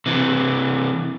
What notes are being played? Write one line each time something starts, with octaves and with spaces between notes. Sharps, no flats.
C3 E3